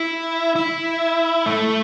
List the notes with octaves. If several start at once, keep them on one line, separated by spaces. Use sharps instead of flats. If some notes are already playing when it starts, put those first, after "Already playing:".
Already playing: E4
E4
A3